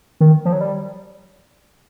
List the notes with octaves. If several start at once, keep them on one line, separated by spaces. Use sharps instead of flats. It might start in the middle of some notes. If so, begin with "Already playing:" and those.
D#3
F3
F#3
G3